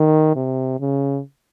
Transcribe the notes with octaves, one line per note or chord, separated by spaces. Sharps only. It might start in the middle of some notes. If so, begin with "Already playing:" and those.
Already playing: D#3
C3
C#3